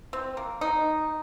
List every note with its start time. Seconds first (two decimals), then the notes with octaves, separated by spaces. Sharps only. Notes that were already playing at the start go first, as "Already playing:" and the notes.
0.13 C4
0.37 A#3
0.61 D#4